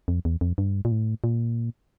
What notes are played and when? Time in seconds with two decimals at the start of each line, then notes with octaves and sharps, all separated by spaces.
0.08 F2
0.25 E2
0.41 F2
0.58 G2
0.85 A#2
0.92 A2
1.24 A#2